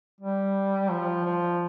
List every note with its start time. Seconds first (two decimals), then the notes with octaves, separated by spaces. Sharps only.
0.21 G3
0.91 F3
1.25 F3